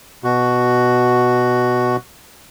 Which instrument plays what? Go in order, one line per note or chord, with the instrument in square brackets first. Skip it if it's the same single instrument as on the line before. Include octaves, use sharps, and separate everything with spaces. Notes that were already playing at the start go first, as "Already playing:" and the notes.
[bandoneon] B2 F#4